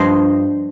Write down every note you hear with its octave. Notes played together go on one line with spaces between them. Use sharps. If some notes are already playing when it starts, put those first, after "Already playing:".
Already playing: G2 F3 C5 D#5